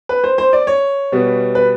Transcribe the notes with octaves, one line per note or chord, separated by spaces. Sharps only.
B4
C5
C5
D5
C#5
B2 G3 B3
B4